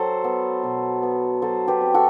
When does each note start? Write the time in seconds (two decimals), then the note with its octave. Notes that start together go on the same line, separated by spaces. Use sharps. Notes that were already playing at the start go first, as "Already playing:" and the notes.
Already playing: F#3 A4 C5
0.24 B3
0.64 B2
1.03 B3
1.42 F#3 A4 C5
1.68 G4 B4
1.81 C4
1.94 F#4 A4